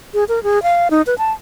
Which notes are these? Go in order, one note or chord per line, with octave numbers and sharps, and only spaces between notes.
G#4
A#4
G#4
F5
D#4
B4
A5